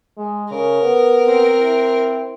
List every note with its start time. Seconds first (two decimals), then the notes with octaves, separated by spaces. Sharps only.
0.18 G#3
0.51 C#3 A#4
0.82 B3
1.25 C4
1.61 E4